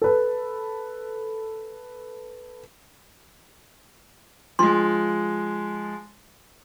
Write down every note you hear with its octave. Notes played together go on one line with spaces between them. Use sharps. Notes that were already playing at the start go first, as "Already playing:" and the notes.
A4 B4
F3 G#3 D4 C6